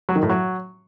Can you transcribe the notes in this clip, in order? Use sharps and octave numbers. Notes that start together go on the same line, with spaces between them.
F#3
D#3
A2
F#3